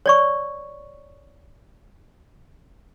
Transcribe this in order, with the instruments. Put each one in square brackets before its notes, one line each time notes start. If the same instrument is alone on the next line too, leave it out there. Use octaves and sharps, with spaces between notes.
[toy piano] C#5 D5 C#6